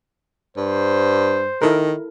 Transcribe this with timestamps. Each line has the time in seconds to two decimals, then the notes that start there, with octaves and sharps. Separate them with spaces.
0.57 G2 C5
1.62 D#3 E4 A4 A#4